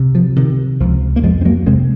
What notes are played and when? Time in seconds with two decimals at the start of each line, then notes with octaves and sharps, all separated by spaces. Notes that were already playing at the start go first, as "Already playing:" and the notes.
Already playing: C#2 C3
0.15 F3
0.36 C3 D#3
0.80 C#2 F3
1.16 A#3
1.23 F2 F3 G#3
1.41 C4
1.45 F#3 A#3
1.66 C3 G#3 C4